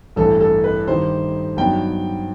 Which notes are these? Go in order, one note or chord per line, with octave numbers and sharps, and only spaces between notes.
A1 G2 E3 A4
A4
B4
G2 D#3 G3 D#4 C5
G2 F#3 B3 D#4 G5